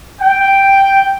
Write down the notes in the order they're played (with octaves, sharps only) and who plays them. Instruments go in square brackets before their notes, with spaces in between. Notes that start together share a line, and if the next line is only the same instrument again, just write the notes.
[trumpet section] G5